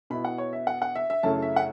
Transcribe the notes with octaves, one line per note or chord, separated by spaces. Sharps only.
B2 B3 E4 B5
F#5
C#5
E5
F#5
F#5
E5
E5
F#2 C#3 A3 C#4 E4 A5
E5
F#5